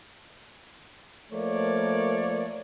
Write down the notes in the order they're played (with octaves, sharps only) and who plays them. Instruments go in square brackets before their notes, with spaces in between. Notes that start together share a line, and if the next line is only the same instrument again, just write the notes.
[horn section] F3 A3 A#3 A#4 C#5 D5